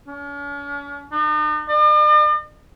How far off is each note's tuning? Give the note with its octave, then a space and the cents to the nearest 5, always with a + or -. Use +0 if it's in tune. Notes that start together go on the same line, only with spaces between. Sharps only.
C#4 +45
D#4 -45
D5 +45